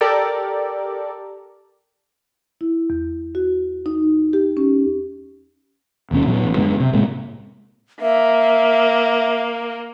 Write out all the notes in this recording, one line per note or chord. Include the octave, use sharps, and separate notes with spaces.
G4 A4 A#4 D5
E4
E2
F#4
D#4
G4
C#4
D#1 D#2 B2 C#4
A#2 F#3 B3
A1
F#2 D3 G#3 B3
C3
A2 C3 G#3 A#3
A#3 E5